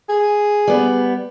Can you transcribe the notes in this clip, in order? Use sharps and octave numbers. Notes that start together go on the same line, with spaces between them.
G#4
G3 B3